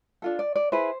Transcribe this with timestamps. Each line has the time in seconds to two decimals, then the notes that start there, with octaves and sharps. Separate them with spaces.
0.22 D4 F4 A4
0.39 D5
0.56 D5
0.72 E4 G#4 B4 C5